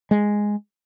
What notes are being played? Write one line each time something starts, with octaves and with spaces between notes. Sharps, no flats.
G#3